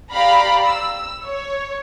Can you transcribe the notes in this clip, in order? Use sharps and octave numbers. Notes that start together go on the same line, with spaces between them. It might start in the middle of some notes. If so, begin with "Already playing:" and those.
G4 D5 F5 A#5 B5
E6
C#5